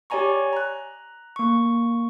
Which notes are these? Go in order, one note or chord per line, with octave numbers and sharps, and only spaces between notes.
G4 C#5 D5 G#5 A#5 C#6
A#5 F#6
A#3 C#6